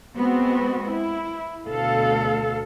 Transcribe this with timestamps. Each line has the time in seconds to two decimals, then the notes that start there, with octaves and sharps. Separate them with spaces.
0.17 G#3 B3 C4 F#4
0.90 E4
1.67 D2 B2 A4 F5